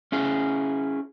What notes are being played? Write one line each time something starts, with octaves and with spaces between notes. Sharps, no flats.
C#4 E4 G#4